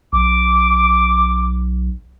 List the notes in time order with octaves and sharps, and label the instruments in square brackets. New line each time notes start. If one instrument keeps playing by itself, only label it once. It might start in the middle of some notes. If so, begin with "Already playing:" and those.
[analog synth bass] B1 [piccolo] D6